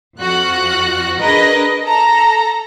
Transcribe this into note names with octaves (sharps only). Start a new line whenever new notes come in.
F2 F4 F#4 F#6
D4 G#4 A#4 B4 D#5
A4 A#5